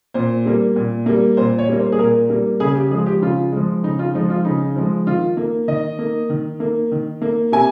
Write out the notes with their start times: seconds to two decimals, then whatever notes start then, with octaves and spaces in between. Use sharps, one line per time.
0.14 A#2 C5
0.46 G3 A#3
0.76 A#2
1.06 G3 A#3
1.37 A#2 C5
1.58 C#5
1.69 G3 A#3
1.79 C5
1.92 G#4
1.99 A#2 A#4
2.30 G3 A#3
2.60 C#3 G#4
2.75 G4
2.91 F3 G#3 G#4
3.06 G4
3.22 C#3 F4
3.52 F3 G#3
3.83 C#3 D#4
3.99 F4
4.15 F3 G#3 D#4
4.30 F4
4.45 C#3 D#4
4.76 F3 G#3
5.07 D#3 F4
5.37 A#3
5.68 D#3 D#5
5.99 A#3
6.30 D#3
6.60 A#3
6.92 D#3
7.22 A#3
7.52 C3 G#5